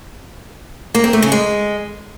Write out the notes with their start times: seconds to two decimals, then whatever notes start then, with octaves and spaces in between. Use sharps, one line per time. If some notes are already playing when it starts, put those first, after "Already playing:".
0.95 A#3
1.04 C4
1.13 A3
1.22 C#3
1.32 G#3